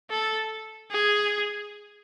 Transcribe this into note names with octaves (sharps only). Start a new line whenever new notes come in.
A4
G#4